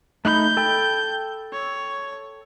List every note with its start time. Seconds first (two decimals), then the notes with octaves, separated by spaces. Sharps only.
0.25 A3 D#4 B5 G6
0.57 A4 G5 B5
1.53 C#5